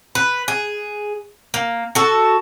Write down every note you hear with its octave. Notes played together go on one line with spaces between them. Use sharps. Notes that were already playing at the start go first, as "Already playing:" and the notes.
B4
G#4
A#3
F#4 A4